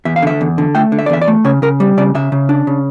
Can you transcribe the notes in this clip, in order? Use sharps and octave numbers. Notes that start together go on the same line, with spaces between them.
E2 E5
F5
D3 E5
E2
D3
A3 G5
D3
E5
D5
E2 E5
D5
A3
C#3 C#5
C#3 A#4
G3
C#3 D5
C#3 E5
C#3
D4
C#3